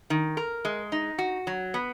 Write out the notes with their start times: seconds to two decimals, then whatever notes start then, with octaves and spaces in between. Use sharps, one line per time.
0.10 D#3
0.37 A#4
0.65 G#3
0.92 D#4
1.18 F#4
1.47 F#3
1.74 B3